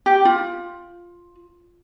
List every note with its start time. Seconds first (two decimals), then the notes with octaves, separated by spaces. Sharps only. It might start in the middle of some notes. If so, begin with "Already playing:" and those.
0.06 G4
0.25 F4